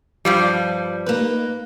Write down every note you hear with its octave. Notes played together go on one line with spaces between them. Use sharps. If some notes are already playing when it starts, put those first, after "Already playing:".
G2 F3 G3
A#3 D#4 B4